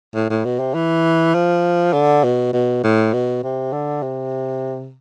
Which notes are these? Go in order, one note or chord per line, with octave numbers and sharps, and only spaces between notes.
A2
A2
B2
C3
E3
F3
D3
B2
B2
A2
B2
C3
D3
C3